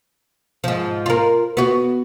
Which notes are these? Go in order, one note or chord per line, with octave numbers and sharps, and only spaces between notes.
G#2 F3
F4 A#4
B3 F#4